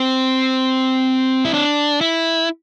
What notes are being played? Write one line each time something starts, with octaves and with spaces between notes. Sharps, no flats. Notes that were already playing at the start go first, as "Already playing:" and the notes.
Already playing: C4
E4
D4
E4